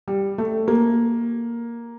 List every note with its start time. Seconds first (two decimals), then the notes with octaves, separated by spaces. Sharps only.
0.08 G3
0.38 A3
0.68 A#3